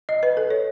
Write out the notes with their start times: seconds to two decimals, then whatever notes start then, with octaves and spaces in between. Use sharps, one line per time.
0.09 D#5
0.23 B4
0.37 A4
0.50 C#5